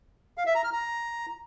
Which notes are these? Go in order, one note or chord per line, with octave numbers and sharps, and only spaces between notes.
F5
E5
A#5
F6
A#5